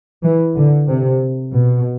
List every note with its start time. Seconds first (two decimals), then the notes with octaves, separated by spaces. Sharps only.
0.24 E3
0.55 D3
0.87 C3
1.52 B2